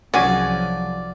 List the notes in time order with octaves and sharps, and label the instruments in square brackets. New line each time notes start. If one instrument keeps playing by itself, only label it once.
[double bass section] C2 F3 F#3 [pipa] C#4 G#4 G#5 [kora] F#4 [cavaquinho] D5